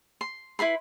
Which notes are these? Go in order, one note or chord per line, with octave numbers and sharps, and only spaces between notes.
C6
E4 B4 B5 C6